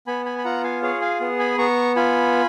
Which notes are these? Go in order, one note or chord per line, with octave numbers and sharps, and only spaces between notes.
B3 G#5 B5
G#5 B5
B5
F4 F#5 A#5
F5 G#5
G#4 C#5 F5
F5 G#5
B3
G#5 B5
B3 A#5 C#6
F4 G#5 B5